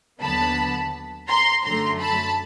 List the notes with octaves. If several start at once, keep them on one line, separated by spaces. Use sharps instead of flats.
D#2 D3 F#3 B3 A5 B5
A#5 C6
F#2 D3 F#3 A3 A#5 C6
A5 B5